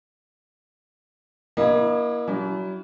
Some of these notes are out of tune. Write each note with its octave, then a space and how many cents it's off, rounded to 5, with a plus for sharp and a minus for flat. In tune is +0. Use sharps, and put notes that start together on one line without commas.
A#3 +30 E4 +0 D#5 -25
F#3 +30 C#4 +45 E4 +0